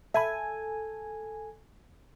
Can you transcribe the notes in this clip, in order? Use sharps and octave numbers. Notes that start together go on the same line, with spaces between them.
A4 E5 G#5 B5